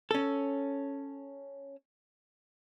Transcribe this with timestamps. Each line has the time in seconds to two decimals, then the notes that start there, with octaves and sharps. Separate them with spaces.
0.11 C#4 A4